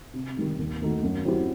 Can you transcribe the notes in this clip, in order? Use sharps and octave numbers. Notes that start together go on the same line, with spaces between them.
C3
D#3 G3 D#4
D#2
D#3 A3 D#4 F#4
F#2
F#3 C4 E4 G4